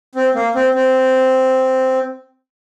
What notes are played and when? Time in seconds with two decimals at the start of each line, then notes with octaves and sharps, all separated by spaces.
0.15 C4
0.35 A#3
0.55 C4
0.74 C4